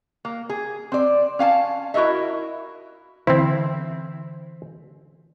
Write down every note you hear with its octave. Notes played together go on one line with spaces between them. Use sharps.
A#3
G#4
C4 D5
C#4 F5 G5 A5
E4 F#4 A#4 D#5 E5
D3 E3 C4 E4 C5 E5